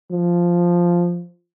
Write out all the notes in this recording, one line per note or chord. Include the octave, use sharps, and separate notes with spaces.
F3